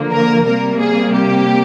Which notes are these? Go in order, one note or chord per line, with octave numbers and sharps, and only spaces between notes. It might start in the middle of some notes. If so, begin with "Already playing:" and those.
Already playing: D3 F3 A#3
A#4
C3 G3 A#3 A#4
G#4
G4